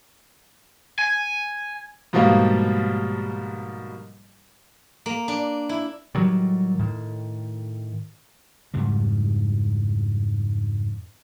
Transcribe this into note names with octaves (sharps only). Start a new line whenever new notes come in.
G#5
G#2 B2 F3 G3 A#3
A#3
D4
E4
A2 D#3 F#3 G3
A2 D#3
F2 G#2 C#3 G3